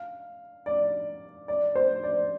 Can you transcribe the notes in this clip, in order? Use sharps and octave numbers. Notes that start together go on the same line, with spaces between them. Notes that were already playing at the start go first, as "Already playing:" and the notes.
Already playing: F5
D5
D5
C5
D5